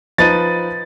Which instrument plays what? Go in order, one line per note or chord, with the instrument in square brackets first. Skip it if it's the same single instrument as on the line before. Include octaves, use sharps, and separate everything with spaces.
[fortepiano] F3 D#4 B4 [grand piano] A6 D#7